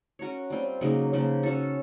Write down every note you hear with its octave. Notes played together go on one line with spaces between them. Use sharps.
C#4 F#4 A#4 C#5
G3 C4 F4
C#3 F#3 A#3 D#4
C#3 F3 A#3
C#4 F#4 A4